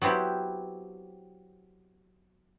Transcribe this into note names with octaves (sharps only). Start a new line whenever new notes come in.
F#3 B3 C4 E4 G4